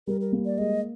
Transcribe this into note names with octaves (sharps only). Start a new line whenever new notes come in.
G3 A#4
A#4
A#3
D5
G#3 D#5